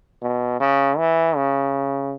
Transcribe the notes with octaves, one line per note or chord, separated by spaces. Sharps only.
B2
C#3
E3
C#3